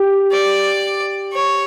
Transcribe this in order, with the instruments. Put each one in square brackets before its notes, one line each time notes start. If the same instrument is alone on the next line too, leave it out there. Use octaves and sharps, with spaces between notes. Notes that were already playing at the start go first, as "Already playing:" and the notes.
Already playing: [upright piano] G4
[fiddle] D5
C#5